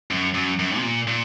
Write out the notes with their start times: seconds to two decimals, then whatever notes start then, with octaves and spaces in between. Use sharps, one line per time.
0.11 F#2
0.35 F#2
0.59 F#2
0.77 C3
0.83 A#2
1.07 A#2